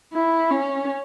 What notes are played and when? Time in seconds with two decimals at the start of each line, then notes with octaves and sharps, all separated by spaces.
0.13 E4
0.50 C#4